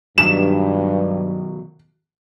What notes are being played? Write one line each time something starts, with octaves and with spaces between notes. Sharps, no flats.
B1 G2 D#3 F#3 E7